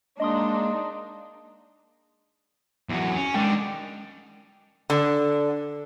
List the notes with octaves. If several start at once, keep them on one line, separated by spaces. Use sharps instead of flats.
G#3 A#3 D4 D#4 D#5 C6 D#6
E2 F#3
C#4
D#3 G#3 D4 G5
D3